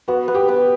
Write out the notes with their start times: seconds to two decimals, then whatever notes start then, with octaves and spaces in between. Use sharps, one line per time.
0.08 B3 F#4
0.28 B3
0.35 G4
0.48 B3